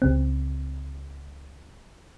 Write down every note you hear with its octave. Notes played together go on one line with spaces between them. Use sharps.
C#2 C#3 C4